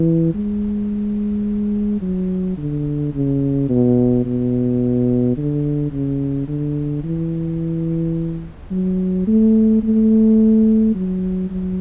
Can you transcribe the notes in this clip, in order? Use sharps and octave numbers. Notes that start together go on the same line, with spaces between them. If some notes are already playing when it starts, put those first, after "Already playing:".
Already playing: E3
G#3
F#3
D3
C#3
B2
B2
D3
C#3
D3
E3
F#3
A3
A3
F#3
F#3